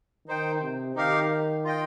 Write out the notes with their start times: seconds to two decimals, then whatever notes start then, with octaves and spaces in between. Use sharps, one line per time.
0.27 D#3 D#4 C5 G5
0.62 C3
0.96 D#3 D#4 G4 A#4 F5
1.65 F4 D#5 G5